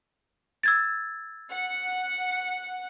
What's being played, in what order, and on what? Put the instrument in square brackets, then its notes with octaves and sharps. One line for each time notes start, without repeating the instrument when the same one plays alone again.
[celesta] E6 G#6 A6
[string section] F#5